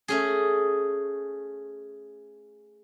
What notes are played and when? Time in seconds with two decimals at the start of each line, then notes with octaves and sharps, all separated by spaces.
0.08 A3 C#4 G#4